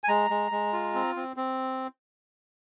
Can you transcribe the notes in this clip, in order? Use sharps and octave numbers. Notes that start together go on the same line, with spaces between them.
G#5
G#3 A#5
G#3
G#3
F4
C4
C4
C4